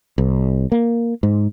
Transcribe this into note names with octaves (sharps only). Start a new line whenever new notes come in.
C2
A#3
G#2